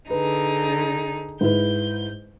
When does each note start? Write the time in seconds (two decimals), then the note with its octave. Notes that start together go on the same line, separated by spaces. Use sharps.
0.10 D3 D#4 G#4 B4
1.41 G#2 E4 B4 G6